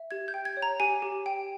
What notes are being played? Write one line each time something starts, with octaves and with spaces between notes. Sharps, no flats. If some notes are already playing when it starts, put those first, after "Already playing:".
Already playing: E5
G4 G#6
G6
G5
G#6
C#5
A#5
G4 G#5
G4
G5